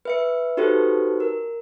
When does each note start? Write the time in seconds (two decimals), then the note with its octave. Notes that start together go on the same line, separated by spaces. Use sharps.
0.05 B4 E5 C#7
0.57 D#4 F#4 G4 A4 B4 C5
1.20 A#4